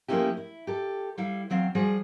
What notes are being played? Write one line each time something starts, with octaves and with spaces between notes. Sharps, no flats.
F3 A3 A#3 C#4 E4 G4
E4
G4 A4
G3 E4 F5
E2 F#3 C4 F5
F3 G3 F#4 G#4